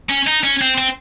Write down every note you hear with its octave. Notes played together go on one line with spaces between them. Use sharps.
C#4
D#4
C#4
C4
C4